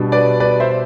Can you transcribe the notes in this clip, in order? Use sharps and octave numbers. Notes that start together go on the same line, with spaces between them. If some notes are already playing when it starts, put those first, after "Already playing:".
Already playing: B2 G3 D4
B4 D5
B4 D5
C5 E5